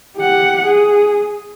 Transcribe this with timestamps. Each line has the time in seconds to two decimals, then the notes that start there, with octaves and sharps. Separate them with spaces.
0.17 G4 F#5
0.65 G#4